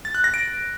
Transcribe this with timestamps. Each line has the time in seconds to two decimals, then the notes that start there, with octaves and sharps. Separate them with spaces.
0.05 A6
0.15 F#6
0.24 A#6
0.34 D7